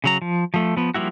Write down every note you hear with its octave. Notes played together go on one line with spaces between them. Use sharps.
C#3 F#3 A#5
F3
F3 A3
F3 B3
F3 G3 A#3 E4 F#4